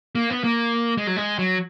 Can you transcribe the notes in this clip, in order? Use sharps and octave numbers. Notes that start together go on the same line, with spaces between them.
A#3
B3
A#3
G#3
F#3
G#3
F#3